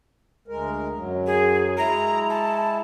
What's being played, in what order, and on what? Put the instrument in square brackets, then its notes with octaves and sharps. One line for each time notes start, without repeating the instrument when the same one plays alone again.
[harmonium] D2 G#3 A#4
F#2 F#3
[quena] G#4
[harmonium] G#3 E4 [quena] A#5
[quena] A5